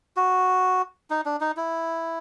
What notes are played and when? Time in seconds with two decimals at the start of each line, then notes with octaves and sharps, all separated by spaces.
0.16 F#4
1.10 D#4
1.26 D4
1.41 D#4
1.57 E4